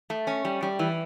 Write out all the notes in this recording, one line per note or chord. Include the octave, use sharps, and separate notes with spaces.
A3
C#4
G3
G3
E3